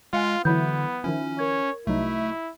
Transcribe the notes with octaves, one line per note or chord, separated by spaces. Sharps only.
G#3 F4 F5 F#5 G#5
D3 E3 F#3 B3 E4 B5 G6
D#3 F3 C#4 E4
A#4 C#5 G#6
C2 F#3 A3 D#4 E4